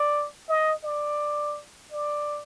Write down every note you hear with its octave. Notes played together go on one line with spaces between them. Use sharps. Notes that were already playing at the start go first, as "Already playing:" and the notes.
Already playing: D5
D#5
D5
D5